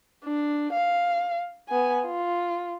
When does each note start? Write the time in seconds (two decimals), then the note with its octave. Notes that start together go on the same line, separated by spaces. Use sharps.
0.24 D4
0.73 F5
1.69 B3 G#5
2.06 F4